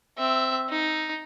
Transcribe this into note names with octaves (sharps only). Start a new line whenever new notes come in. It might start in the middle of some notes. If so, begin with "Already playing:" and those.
C4 E5
D#4